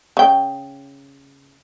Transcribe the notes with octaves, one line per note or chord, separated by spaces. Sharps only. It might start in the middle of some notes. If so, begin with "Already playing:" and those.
C#3 G5